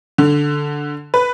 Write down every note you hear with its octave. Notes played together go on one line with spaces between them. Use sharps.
D3
B4